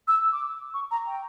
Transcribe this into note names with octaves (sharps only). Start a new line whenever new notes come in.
E6
D6
C#6
A#5
G5